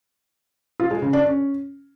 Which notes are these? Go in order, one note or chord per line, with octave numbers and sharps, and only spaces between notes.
F4
G#3
C#3
D4
C#4